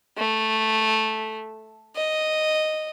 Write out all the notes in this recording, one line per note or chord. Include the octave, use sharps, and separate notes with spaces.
A3
D#5